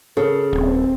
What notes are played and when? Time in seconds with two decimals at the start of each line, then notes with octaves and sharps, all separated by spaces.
0.17 C#3 A4 A#4
0.53 D#1 C4